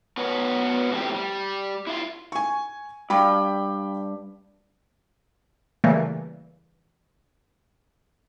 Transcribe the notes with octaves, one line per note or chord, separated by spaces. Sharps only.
B3 C#4 F#4 B4
A2 F3 G3 G#3 C4 G4
G3
E4 F4
G#5 C#6
G2 F5 G5 B5
C#3 E3 G3 A3 A#3